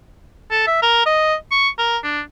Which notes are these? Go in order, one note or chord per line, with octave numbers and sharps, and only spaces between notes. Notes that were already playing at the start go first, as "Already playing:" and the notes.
A4
E5
A#4
D#5
C#6
A#4
D4